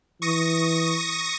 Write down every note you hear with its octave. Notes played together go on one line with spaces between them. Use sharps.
E3 C#6 D#6 A#6